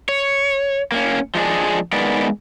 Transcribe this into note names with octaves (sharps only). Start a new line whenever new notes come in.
C#5
A#3 C4 C#4
F3 G#3 A3 D4 G#4
G#3 B3 D#4 A#4 B4 D5